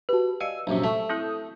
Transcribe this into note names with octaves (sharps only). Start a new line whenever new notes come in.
F#4 G4 B4 A5
D5 D#5 F5 G#5 E6
A#1 F#2 C3
A3 E5 A5 C#6
C4 E4 A4 D#6 G6